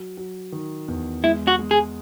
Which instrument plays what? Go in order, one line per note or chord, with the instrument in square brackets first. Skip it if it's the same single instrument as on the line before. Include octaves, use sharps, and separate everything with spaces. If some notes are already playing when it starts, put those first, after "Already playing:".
Already playing: [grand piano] F#3
F#3
D#3
E2
[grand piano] G#3 [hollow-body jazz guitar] E4
[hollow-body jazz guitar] F#4
[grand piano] G#3
[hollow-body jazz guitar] G#4